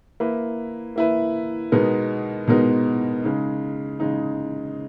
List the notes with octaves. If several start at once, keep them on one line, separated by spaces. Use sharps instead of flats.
A#3 E4 B4
A#3 E4 B4
B2 G#3 B3 D#4 A#4
B2 G#3 B3 D#4 A#4
C#3 G#3 D#4
C#3 G#3 D#4